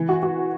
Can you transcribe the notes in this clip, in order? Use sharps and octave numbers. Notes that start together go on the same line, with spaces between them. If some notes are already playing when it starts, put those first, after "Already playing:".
Already playing: E3
F#4
F#4